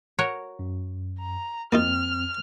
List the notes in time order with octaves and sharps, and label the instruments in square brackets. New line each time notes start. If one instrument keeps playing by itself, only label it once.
[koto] F#4 A#4 C#5
[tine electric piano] F#2
[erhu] A#5
[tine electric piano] F2 C4 [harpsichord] A#3 D#4 F4 [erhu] F6